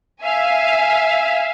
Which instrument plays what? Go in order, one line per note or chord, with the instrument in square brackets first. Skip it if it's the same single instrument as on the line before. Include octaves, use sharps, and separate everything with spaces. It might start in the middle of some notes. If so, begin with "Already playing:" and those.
[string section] E5 F5 G#5